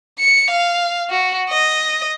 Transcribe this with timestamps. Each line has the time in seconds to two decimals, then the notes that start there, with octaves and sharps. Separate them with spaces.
0.19 C#7
0.50 F5
1.10 F#4
1.49 D#5